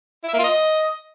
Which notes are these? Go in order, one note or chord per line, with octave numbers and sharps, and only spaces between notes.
E4
E5
A#3
F4
D#5